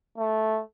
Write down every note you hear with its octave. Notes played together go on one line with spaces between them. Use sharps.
A3